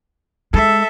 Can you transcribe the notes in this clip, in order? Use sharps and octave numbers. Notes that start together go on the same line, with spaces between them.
G#3 A4 E5